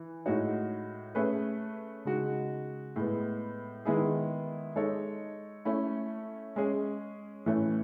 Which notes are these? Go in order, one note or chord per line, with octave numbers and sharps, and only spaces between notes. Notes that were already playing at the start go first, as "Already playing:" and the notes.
Already playing: E3
A2 G#3 D#4 F#4 C#5
A3 C#4 G#4 B4
C#3 G#3 D#4 F#4
A2 G#3 B3
D#3 G#3 B3 E4 G#4
G#3 D#4 A4 C#5
A3 C#4 E4
G#3 C#4 G#4
A2 E3 A3 C#4